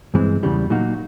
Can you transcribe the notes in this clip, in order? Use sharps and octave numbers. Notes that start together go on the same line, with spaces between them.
G2 E3 G#3 C4
E2 C#3 E3 G3
A#2 F#3 A#3 D#4 F#4